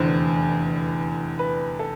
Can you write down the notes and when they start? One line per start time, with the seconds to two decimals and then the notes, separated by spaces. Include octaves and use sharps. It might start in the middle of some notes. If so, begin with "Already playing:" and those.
Already playing: F1 E2 D3 C5
1.39 B4
1.79 A4